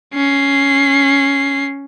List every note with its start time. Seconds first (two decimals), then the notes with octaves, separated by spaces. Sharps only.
0.14 C#4 C7